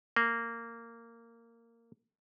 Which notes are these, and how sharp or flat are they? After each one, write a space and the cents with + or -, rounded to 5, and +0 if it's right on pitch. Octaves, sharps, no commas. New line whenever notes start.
A#3 -15